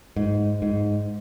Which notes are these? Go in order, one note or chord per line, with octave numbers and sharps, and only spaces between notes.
G#2
G#2